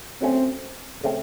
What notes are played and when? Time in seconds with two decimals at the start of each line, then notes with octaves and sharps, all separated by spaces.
0.21 F#3 A3 C4 C#4
1.04 C#3 A3 C4